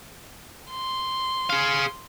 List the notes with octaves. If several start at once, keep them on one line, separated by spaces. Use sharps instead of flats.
C6
G#4 F5